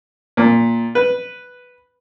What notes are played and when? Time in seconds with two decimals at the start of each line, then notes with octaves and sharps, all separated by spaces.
0.37 A#2
0.95 B4